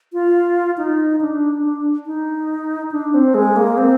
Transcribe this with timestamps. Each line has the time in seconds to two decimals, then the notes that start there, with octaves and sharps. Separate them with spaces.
0.13 F4
0.78 D#4
1.21 D4
1.64 D4
2.06 D#4
2.91 D4
3.14 C4
3.35 G#3
3.56 A#3
3.77 C4